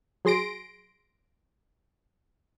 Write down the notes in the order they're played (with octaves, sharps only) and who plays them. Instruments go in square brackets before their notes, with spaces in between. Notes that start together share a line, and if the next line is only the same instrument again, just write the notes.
[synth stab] F#3 G#4 C6 A#6 D7